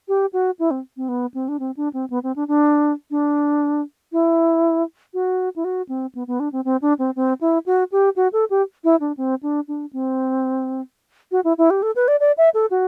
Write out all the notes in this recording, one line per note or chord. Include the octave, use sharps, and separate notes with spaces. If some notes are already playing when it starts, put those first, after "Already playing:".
G4
F#4
E4
C4
C4
B3
C4
D4
C4
D4
C4
B3
C4
D4
D4
D4
E4
F#4
E4
F#4
C4
B3
B3
D4
C4
C4
D4
C4
C4
E4
F#4
G4
F#4
A4
G4
E4
D4
C4
D4
D4
C4
F#4
E4
E4
G4
A4
B4
D5
D5
E5
A4
F#4